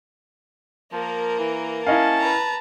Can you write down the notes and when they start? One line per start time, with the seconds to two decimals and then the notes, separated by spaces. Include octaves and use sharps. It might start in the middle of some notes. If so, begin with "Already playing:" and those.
0.92 F3 A#3 A#4
1.39 E3
1.87 C#4 E4 D#5 F5 A5
2.18 B4 A#5